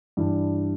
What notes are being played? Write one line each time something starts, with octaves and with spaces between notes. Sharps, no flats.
G2 E3 G3 D4